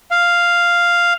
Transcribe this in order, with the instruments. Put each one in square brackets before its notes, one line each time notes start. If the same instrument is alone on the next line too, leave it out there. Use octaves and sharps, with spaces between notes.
[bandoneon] F5